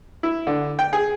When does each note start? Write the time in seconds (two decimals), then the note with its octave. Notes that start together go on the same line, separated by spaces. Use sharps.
0.23 E4
0.47 D3
0.79 G5
0.93 G#4